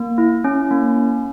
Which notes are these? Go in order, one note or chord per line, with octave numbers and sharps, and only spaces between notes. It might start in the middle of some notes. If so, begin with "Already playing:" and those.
Already playing: A#3
E4
C#4
A#3